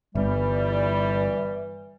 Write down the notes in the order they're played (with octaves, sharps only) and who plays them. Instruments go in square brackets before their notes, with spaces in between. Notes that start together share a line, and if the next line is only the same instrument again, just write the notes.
[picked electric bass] G1 [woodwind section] E3 G3